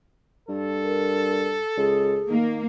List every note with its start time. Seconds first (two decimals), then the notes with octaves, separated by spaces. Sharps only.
0.49 G2 A4
0.84 A#4
1.77 C#2 G#4
2.29 D#3 A#3